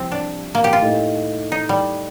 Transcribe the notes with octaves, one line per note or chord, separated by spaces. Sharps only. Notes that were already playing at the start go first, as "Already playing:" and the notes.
Already playing: C2 C3 F3 C4
D4
A#3
G4
F4
A2 A3 D#4
D#4
G3